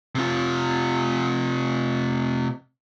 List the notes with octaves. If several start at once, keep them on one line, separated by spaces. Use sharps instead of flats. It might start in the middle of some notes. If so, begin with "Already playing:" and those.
C3 F4